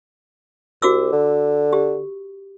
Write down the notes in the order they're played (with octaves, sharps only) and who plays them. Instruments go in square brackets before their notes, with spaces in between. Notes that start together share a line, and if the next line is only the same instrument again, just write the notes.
[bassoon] C2 [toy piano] F#4 D6 E6
[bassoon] D3
[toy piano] G4